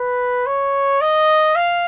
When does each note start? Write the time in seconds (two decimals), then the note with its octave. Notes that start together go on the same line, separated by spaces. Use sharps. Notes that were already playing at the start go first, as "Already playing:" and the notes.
Already playing: B4
0.46 C#5
1.01 D#5
1.56 F5